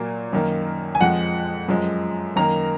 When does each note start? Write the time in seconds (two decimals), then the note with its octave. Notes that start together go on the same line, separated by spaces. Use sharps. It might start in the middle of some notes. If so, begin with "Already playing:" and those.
Already playing: A#2 F#3 A#3
0.33 F#2 D#3 A#3
0.95 G#5
1.00 F2 F3 G#3 F#5
1.68 F#2 F3 G#3
2.36 F#2 D#3 A#3 A#5